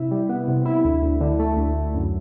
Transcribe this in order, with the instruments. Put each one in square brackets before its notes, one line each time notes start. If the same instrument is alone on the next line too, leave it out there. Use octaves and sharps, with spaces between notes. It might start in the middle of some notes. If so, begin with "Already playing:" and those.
Already playing: [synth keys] C3 E4
G3
B3
C3
E4
D2
D2
D3
A3
D2
D2
F#2